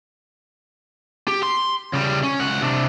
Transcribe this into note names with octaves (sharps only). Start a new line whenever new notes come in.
G4
C6
C#3 G3
C#4
C#2 F#5
C3 D4